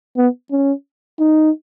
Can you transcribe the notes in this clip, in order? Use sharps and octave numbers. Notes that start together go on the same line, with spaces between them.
B3
C#4
D#4